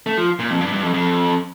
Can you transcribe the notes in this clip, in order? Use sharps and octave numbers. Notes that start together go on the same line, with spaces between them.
A3
F3
A#2
F2
G2
G2
F2
F2